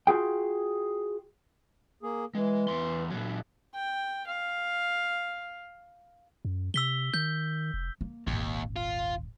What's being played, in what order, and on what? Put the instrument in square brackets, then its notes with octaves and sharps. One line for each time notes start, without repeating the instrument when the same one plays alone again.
[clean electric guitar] F4 F#4 G#4 G5
[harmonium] A#3 G#4
[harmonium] E3 [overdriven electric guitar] G#3
[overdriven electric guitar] E2 C6
A#2 F#3
[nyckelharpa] G5
F5
[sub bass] F#2
[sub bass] C3 [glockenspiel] E6 B6 G7
[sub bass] D#3 [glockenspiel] G6
[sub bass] F1
[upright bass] A#3
[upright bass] D#1 G#1 [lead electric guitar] D#2
[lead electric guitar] F4